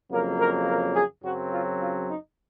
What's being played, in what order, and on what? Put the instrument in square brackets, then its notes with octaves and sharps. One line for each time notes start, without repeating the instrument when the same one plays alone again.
[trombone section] F2 C#3 F#3 A#3 A#4
A#4
A#4
G#4
F#2 C#3 F#3 C4 F#4
F4
F4
D#4